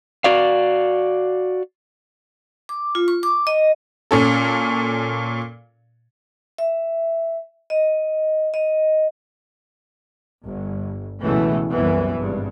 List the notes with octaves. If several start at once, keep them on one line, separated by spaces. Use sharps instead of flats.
F#4 D5 F5
D6
F4
C#6
D6
D#5
A#2 C#4 A4
E5
D#5
D#5
G1
C#2 B2 E3 A3
C2 F#2 B2 E3
G#1 G2